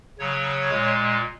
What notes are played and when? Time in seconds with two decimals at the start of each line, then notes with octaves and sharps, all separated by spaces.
0.19 C#3 F#3 C#5
0.71 A#2 G#3